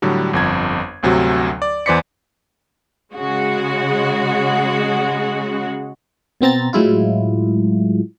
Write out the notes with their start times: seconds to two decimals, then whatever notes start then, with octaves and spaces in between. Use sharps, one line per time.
0.02 A2 D3 F#3 G3
0.33 G1 F2 G#6
1.03 G1 D2 C3 F#3 F#4
1.62 D5
1.86 E2 E3 C5 D5 B6 C#7
3.16 C#3 G#3 F#4
6.41 B2 B3 C4 A#5 A6
6.73 A2 F#3 G#3 E4 F4